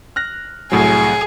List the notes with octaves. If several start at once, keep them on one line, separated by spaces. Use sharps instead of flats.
F6 F#6 A#6
C2 A2 F#3 G#4